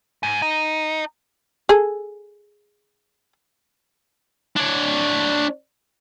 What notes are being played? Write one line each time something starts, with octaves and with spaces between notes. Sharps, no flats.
G#2
D#4
G#4 A4
D4 C#5